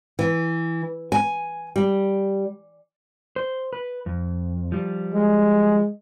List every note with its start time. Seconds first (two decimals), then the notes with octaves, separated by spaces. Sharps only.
0.19 E3
1.12 G#5
1.76 G3
3.36 C5
3.73 B4
4.06 F2
4.72 F3 G3
5.14 G#3